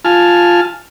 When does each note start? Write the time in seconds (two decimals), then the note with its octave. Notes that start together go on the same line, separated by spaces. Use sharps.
0.05 F4 G#5 A5 F6